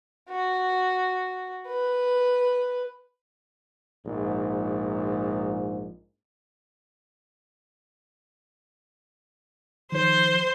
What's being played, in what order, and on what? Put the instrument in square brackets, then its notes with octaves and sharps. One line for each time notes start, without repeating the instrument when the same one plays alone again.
[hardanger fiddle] F#4
B4
[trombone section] A#1 G#2
[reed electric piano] D#3 F3 [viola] C5